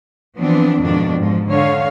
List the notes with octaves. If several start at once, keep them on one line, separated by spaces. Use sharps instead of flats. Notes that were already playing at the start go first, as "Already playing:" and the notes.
E3 F3 B3 C4 D4
F2 G#2 B2 D#3 D4
G#2 F3
D3 C#5 F5